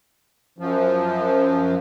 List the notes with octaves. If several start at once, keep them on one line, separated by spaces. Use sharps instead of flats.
F#2 F3